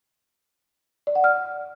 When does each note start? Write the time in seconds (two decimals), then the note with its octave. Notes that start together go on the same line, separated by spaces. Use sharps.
1.07 D5
1.15 F#5
1.24 F6